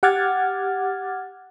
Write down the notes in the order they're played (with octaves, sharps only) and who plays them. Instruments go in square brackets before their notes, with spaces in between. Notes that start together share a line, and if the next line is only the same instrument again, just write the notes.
[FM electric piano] G4 F#5 D6 F6 G#6 A6